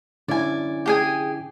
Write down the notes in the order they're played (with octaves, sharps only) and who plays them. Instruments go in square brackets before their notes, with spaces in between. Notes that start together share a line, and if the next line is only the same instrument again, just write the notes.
[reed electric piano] D3 C#4 E4 [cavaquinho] D5 G#5
[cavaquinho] G4 G#4 G#5